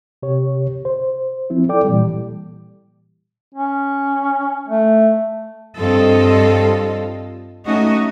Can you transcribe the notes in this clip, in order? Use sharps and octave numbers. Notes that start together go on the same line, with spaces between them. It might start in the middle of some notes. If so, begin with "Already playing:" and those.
C3 G4 C#5
C5
F3 C4 E4
A4 D5 G5 D6
A#2 E3 G3
C#4
A3
G2 G3 C4 F4 A4 D#5
A3 C#4 D#4 F#4 D#5